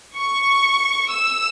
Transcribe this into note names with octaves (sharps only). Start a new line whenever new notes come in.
C#6
E6